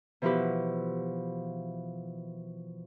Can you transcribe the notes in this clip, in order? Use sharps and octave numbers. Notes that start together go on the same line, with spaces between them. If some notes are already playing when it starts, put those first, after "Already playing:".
B2 E3 F3 E4 G4 B4